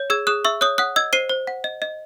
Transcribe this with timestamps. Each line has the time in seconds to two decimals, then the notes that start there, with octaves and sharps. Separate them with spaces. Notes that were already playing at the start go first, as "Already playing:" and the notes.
Already playing: C#5
0.10 G#4 E6 G#6
0.27 G#4 D#6 F#6
0.45 E5 C#6 E6
0.61 C#5 D#6 F#6
0.78 F#5 D#6 F#6
0.96 D#5 E6 G#6
1.13 C5 C7 D#7
1.29 C5
1.47 F#5
1.64 D#5
1.82 D#5